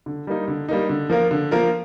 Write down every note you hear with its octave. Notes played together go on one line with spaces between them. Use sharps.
D3
G3 A#3 D#4
D3
G3 A#3 D#4
D3
F3 A#3 F4 A#4
D3
F3 A#3 F4 A#4